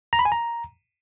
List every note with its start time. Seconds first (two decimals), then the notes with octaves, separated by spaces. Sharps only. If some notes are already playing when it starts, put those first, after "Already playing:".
0.13 A#5
0.19 B5
0.25 G#5
0.32 A#5